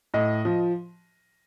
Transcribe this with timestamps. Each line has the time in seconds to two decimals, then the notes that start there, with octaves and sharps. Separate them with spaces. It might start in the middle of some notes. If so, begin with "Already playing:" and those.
0.14 A2 D#5
0.45 F3